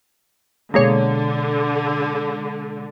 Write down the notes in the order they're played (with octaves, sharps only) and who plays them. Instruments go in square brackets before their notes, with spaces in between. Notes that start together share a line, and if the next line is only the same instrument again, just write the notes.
[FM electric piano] B2 G#3 [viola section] D3 [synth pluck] A#3 G#4 C#5